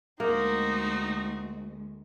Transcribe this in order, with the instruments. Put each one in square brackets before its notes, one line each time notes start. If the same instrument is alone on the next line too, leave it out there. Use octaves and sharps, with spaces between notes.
[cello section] D2 G#3 [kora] A#3 [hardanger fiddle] C4 F#4 [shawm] D#4